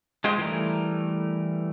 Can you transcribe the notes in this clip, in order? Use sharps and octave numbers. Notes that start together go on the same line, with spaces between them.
G#3 F4 G4 C5 D#5
E3 G3 A3 A#4